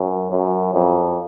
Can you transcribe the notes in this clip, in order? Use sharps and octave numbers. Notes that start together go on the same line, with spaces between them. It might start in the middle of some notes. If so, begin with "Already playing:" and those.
Already playing: F#2
F#2
F2